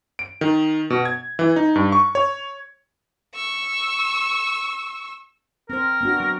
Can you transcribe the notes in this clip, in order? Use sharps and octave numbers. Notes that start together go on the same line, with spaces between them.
D7
D#3
B2
G#6
E3
D#4
G2
C#6
C#5
C#6 E6
C4 A#4 C5
B3 D4 F#4
F#3